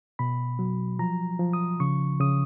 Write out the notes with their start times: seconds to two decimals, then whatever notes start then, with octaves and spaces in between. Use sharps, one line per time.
0.19 B2 B5
0.59 F#3
0.99 F3 A#5
1.39 F3
1.53 D#6
1.80 C#3 C#6
2.20 C#3 D#6